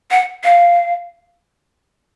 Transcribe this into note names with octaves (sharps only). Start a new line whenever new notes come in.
F#5
F5